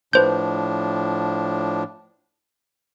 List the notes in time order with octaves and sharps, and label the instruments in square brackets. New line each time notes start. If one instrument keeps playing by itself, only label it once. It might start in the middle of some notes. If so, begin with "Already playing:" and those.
[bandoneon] A2 F3 D4 [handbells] B4 C5 G6